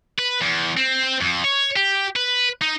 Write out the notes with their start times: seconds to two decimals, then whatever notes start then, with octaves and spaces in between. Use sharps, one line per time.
0.18 B4
0.41 E2
0.77 C4
1.21 F2
1.44 C#5
1.76 G4
2.16 B4
2.62 D#4